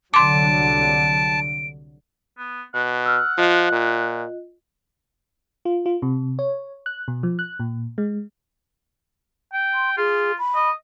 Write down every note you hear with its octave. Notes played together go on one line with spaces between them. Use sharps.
C2 D3 F#3 A5 C6 D6 D7
B3
B2 F#5
E6 F6
F3 F4 D#5
A#2
F4
F4
C3
C#5
F#6
B2
F3
F#6
A#2
G#3
G5
C6
F4 G#4
B5
D#5